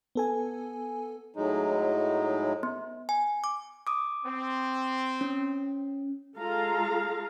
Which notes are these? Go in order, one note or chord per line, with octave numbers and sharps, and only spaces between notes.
B3 A4 G#5
A2 F#3 G#3 D#4
B3
G#5
D6
D6 D#6
C4
C#4
G#3 F4 A4 F5 A#5